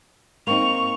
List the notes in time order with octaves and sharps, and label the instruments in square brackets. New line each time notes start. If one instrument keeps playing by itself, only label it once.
[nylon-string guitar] A#3 C4 D#4 [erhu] C#6 [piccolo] F7